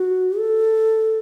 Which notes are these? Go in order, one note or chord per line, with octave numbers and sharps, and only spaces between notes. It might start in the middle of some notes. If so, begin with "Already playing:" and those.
Already playing: F#4
A4